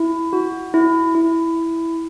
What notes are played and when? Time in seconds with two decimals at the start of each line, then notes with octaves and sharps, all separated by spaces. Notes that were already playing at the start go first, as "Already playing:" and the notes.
Already playing: E4
0.33 F#4
0.74 E4
1.15 E4